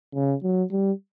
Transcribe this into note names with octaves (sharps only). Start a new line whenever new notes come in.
C#3
F#3
G3